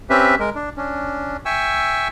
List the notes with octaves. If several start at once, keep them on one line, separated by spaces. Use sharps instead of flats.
C4 C#4 G4 B4 E5
G#3 A#4
D4
C#4 D4
E5 G5 G#5 C#6 E6